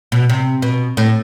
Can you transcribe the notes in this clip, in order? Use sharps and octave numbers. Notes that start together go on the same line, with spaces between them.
B2
C3
B2
A2